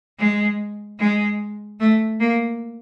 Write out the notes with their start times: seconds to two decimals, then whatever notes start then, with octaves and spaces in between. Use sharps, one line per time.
0.18 G#3
0.99 G#3
1.80 A3
2.20 A#3